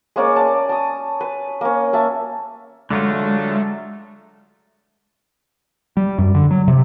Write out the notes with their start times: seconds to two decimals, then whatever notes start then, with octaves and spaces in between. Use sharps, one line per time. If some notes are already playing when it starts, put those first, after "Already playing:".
0.16 G#3 A#3 C#4 D5
0.36 A5
0.69 A5 D#6
1.21 B4
1.61 A#3 C#4
1.93 A#3 E5 A5
2.90 D3 F#3 G#3 A3 F4
5.97 G3
6.18 F#2
6.35 D3
6.51 F#3
6.68 C3